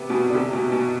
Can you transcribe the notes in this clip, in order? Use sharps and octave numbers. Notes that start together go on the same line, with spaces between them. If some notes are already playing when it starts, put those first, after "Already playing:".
Already playing: C3 B3
B2
D3
C3
B2
B2